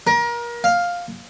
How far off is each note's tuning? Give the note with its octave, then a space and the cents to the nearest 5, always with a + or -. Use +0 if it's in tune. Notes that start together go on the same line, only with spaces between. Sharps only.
A#4 +30
F5 +5